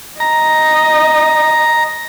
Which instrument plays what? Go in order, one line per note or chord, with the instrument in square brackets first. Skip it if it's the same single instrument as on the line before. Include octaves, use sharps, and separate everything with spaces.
[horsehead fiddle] D#5 [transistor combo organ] A#5